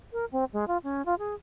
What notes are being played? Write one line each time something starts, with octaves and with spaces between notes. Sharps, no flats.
A#4
C4
G#3
F4
C#4
F4
G#4